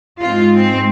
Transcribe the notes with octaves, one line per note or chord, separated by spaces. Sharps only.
G#2 G#3 C4 F4
C4